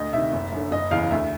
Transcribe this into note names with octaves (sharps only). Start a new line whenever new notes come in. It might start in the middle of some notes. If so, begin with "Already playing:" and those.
Already playing: D2 D#5
C3 D#3 E5
F#1
F#2 D3
F#1 D#5
E2 C#3 E3 F5
D2 E5